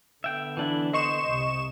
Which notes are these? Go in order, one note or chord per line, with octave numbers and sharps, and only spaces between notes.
D3 B3 E5 G5
E3 D4 E4
C5 D#5 C#6 E7
C2 C3